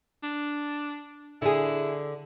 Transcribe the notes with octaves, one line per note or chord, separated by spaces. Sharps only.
D4
D3 E4 G#4